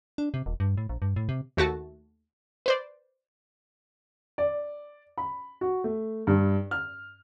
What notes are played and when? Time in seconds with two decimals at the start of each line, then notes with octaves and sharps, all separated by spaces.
0.18 D4
0.34 C3
0.46 D#1
0.60 G2
0.77 A2
0.89 A#1
1.02 G2
1.16 A2
1.29 C3
1.57 D#2 A3 F#4 A5
2.66 B4 C5 D5
4.38 D5
5.18 B5
5.61 F#4
5.84 A3
6.27 G2
6.71 F6